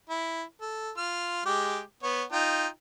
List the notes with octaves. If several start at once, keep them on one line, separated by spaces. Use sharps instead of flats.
E4
A4
F4 F6
G#3 G4 D6
B3 C#5
D#4 F4 G5